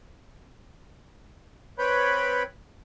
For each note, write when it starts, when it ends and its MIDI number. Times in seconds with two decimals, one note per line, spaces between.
1.79 2.43 60
1.79 2.43 71
1.79 2.43 73
1.79 2.43 79
1.79 2.43 83